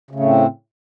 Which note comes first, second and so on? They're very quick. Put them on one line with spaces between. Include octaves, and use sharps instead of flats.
C#3 A3 A2 C4